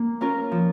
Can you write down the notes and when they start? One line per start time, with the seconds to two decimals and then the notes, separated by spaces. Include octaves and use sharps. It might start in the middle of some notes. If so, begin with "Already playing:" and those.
Already playing: A#3
0.21 C#4 F4 A#4
0.52 F3